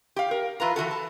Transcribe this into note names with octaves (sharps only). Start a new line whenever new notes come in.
G4 F5
A#4
E3 F4 B4 A#5
E3 F3 F#4 A4
A5